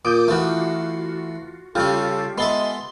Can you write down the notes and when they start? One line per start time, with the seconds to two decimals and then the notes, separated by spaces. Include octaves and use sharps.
0.05 A#2 D6 D#6 G6
0.28 E3 A3 F4 F#4
1.75 C#3 G3 C#4 F4 G4 A4
2.38 G#3 B3 A4 E5 C6 G7